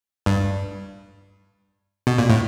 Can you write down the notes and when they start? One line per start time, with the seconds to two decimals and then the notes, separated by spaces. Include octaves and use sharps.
0.26 G2
2.07 B2
2.19 A#2
2.30 A2